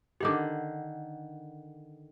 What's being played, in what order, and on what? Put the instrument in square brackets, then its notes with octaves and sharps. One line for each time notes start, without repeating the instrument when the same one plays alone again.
[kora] D3 D#3 F#5 [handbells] G4 D6